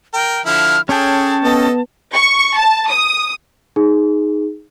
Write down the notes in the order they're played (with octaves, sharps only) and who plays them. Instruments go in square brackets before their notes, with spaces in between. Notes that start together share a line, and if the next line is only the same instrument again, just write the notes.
[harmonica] A#4 [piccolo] G5
[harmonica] D3 F3 E4 [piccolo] F6
[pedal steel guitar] C#4 C#5 G5 [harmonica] G#4 A4 [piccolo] A5
[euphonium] B3 [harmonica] A4 D#5
[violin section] C#6
A5
D#6
[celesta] D#4 G#4